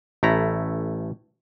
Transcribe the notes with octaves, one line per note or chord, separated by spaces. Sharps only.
A1 A3 E4 A#5